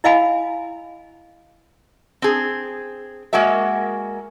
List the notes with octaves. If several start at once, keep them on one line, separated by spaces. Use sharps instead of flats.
E4 D#5 F5 G#5 B5
C4 G#4
G#3 A#3 F#4 A#4 E5